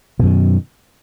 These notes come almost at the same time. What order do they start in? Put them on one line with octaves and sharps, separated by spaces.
B2 F#2 D#3